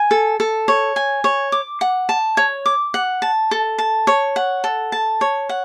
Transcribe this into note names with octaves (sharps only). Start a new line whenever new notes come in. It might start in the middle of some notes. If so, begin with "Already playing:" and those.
Already playing: G#5
A4
A4
C#5
G#5
C#5
D6
F#5
A5
C#5
D6
F#5
A5
A4
A5
C#5
F#5
A4
A5
C#5
F#5